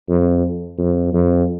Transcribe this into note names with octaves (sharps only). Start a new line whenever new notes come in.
F2
F2
F2